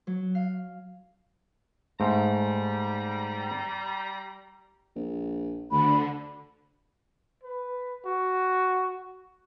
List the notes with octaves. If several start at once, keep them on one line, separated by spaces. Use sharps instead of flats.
F#3
F5
G#2 G3 A3 A#5
A#1
D2 D3 B5
B4
F#4